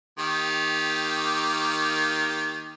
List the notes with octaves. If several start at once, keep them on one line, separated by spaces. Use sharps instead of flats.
D#3 A#3 G4